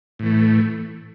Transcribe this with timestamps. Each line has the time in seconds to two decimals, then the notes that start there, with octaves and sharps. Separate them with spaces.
0.19 A2
0.23 E3
0.26 A3